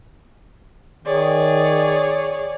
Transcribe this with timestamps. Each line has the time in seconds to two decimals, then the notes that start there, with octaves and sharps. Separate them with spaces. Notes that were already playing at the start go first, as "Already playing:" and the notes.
1.04 D#3 G#4 C#5 D5